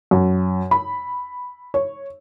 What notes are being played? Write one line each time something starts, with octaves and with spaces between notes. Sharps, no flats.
F#2
B5
C#5